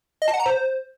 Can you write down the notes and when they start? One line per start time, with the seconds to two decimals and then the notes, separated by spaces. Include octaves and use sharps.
0.22 D#5
0.28 A5
0.34 F#5
0.40 A#5
0.46 C5